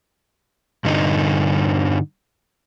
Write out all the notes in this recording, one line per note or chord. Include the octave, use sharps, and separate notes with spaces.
G2 D3 D#4